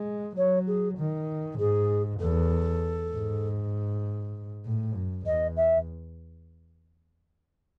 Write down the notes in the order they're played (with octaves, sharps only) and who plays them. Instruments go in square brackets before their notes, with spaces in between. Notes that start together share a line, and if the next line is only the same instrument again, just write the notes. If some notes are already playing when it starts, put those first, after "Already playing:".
Already playing: [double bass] G#3
[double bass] F#3 [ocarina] C#5
[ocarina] G#4
[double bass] D#3
[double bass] G#2 [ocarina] G#4
[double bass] E2 [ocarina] A4
[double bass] G#2
A2
F#2
[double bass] E2 [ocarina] D#5
[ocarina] E5